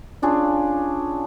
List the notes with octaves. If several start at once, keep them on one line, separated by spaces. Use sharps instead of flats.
C#4 D4 F4 G#4